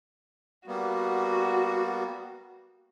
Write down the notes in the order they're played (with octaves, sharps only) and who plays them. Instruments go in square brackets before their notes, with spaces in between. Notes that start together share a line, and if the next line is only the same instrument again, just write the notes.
[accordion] G3 A#3 B3 [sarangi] F#4